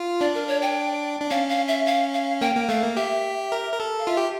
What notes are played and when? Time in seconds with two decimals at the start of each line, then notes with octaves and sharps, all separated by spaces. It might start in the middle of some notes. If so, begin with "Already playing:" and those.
Already playing: F4
0.20 D4 D5
0.34 A#4
0.48 C#5
0.62 G5
1.21 D4
1.31 C#4 F5
1.49 F5
1.68 E5
1.86 F5
2.14 F5
2.41 A#3 G5
2.55 A#3
2.69 A3 F5
2.83 A#3
2.96 G4 E5
3.52 A#4
3.73 A#4
3.80 A4
3.99 F5
4.07 F4 E5
4.17 G4